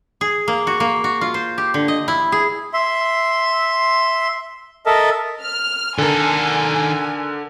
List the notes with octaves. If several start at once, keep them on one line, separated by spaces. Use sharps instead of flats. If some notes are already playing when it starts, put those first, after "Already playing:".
G#4
A#3
F#4
A#3
F#4
F4
C5
G4
D3
D#5
E4
G#4
E5 C6
A4 A#4 D#5 E5 A5
F6
D3 D#3 A4 A#4 G#5